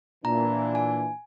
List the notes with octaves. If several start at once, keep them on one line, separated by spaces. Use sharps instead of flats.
A#2 E3 D4 A#5
G#5